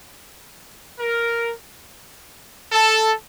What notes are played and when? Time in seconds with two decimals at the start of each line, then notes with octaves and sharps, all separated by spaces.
1.00 A#4
2.72 A4